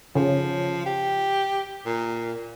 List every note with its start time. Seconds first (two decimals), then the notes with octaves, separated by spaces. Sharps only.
0.15 C#3 F3
0.86 G4
1.85 A#2